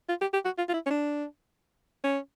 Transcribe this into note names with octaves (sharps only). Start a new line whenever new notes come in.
F4
G4
G4
F#4
F4
F4
E4
C#4
D4
C#4